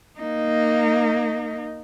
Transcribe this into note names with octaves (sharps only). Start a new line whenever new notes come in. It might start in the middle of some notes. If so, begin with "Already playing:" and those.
A#3 D#4